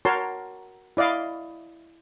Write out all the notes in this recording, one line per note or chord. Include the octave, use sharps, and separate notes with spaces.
F#4 A#4 C#5 A5 C6
E4 D5 D#5 F5